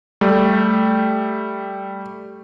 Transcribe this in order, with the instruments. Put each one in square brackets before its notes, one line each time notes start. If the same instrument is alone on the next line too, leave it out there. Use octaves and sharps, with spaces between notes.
[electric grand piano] G3 A3